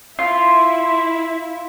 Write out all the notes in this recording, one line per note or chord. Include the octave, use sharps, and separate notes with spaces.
E4 F4 E5